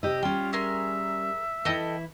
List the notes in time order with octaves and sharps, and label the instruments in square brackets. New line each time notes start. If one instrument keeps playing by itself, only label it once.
[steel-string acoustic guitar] C3 G4 D#5 [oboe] E6
[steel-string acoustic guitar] G3 C#4 [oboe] F4 [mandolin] G5
[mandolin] G#4 A#4 C6 [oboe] E5
[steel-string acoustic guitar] E3 E4 [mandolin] A4 D#5 G5